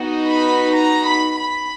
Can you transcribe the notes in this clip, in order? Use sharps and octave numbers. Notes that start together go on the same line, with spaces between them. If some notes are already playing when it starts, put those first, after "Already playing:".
Already playing: B3 D#4 F#4
B5
A#5
B5
B5